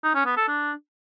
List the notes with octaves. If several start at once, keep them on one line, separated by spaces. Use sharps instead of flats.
D#4
C#4
B3
A4
D4